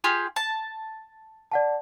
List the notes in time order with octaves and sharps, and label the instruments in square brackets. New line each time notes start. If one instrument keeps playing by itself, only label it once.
[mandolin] F4 G4 G#4
A5
[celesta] D5 F#5 A5